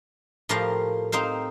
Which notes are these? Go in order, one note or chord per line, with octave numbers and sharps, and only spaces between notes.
A2 F3 G4 A#4 F5
C4 D#4 C5 F5